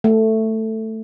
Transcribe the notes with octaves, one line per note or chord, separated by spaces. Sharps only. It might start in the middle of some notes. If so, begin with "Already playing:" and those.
A3